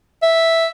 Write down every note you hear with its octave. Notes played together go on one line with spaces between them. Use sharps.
E5